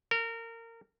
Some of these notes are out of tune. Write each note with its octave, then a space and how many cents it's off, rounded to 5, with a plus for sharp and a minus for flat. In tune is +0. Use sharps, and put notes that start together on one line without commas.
A#4 -25